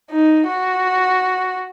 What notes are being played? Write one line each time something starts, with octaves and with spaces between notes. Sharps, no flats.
D#4
F#4